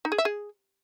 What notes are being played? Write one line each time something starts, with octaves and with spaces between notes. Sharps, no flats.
D#4
G#4
E5
G#4